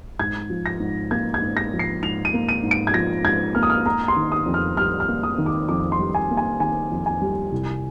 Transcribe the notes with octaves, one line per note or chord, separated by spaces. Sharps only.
G#2 G#6
F3
A#6
G#2
A#3 G#6
G#6
G#2
A#6
F3
C7
G#2 F7
D#7
A#3
D#7
G#2
D7
G#6
F3 A#6
G#2 G#6
A#3 F6
D#6
F6
A#3 A#5
C6
D#3
D#6
F2
F6
G3 F6
F6
A#3
D#6
D#3
D6
F2 D6
C6
G3
G#5
A#3
G#5
D#3 G#5
F2
G#5
G3
C2